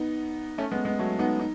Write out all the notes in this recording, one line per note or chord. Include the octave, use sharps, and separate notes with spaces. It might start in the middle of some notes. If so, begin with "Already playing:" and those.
Already playing: B3 D#4
A3 C#4
G#3 B3
G#3 B3
F#3 A3
B3 D#4
D#4